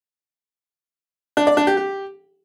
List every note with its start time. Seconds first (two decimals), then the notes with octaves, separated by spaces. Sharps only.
1.37 D4
1.47 D5
1.57 D4
1.67 G4
1.77 G4